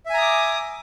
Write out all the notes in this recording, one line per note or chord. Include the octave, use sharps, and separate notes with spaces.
E5 G#5 A#5 D6 D#6